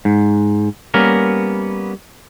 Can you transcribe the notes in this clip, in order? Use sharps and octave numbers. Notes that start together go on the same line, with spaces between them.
G#2
G3 A#3 B3 C#4 A#4